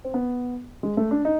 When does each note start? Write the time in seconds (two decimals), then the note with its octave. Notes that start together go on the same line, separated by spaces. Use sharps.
0.04 C4
0.14 B3
0.83 G#3
0.97 A3
1.11 D4
1.25 D#4